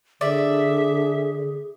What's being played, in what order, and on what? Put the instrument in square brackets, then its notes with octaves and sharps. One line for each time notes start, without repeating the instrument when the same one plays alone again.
[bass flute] D3 [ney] G#4 [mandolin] D5 [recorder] E5